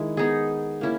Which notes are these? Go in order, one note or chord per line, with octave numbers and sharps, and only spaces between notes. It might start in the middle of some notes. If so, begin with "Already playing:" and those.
Already playing: D#3 G#3 E4
B3 D#4 G#4
A#3 C#4 E4